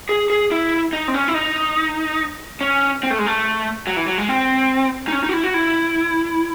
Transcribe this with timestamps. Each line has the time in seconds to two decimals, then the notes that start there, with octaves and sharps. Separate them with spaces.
0.09 G#4
0.30 G#4
0.51 E4
0.93 D#4
1.08 C4
1.14 C#4
1.28 E4
1.34 D#4
2.61 C#4
3.03 C4
3.11 A3
3.19 G#3
3.26 A3
3.87 F#3
3.96 E3
4.07 F#3
4.18 G#3
4.28 C4
5.08 D#4
5.12 C#4
5.23 D#4
5.29 F#4
5.33 E4
5.43 F#4
5.54 E4